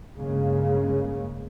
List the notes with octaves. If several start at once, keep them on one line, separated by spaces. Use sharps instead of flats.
G2 C#3 G#3 A#3